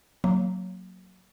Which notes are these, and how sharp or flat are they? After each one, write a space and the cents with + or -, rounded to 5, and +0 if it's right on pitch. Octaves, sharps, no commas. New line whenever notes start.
F#3 +0 A#3 -15